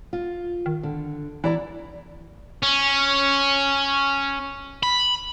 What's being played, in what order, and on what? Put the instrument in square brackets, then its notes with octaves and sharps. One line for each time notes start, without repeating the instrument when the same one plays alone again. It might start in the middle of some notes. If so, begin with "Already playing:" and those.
[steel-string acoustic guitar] F4
[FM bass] D#3
[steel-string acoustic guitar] D3
[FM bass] E3 [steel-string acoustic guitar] E4 D5 A#5
[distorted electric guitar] C#4
B5